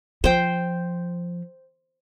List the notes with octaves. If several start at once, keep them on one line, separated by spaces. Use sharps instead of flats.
F3 C5 G5